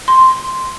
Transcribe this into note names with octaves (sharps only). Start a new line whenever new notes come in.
C6